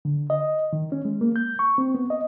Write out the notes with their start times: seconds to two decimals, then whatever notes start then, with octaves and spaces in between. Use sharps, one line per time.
0.05 D3
0.30 D#5
0.73 D#3
0.92 C#4
1.05 G#3
1.21 A#3
1.36 G6
1.59 C#6
1.78 C4
1.95 B3
2.10 D#5